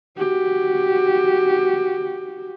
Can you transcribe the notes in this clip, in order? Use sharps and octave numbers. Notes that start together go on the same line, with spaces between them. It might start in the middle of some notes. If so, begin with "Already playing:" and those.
F#4 G4